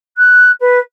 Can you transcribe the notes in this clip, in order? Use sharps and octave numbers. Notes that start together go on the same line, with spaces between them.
F#6
B4